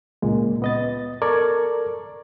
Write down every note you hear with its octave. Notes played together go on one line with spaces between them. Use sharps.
C#2 A#2 G#3
B3 D#5 A6
A4 A#4 D5 C#6 G#6